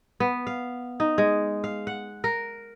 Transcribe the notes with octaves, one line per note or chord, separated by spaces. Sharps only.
B3
F5
D#4
G#3
F5
F#5
A#4